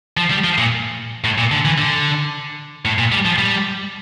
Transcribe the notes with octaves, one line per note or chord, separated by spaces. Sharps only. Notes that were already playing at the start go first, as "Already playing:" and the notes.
F3
G3
F3
A#2
A2
A#2
D3
E3
D3
A2
A#2
G3
F3
G3